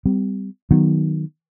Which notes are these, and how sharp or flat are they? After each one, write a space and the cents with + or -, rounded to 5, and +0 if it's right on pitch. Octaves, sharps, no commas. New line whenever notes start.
G3 +0 C4 -40
D#3 -5 F#3 +0 B3 +0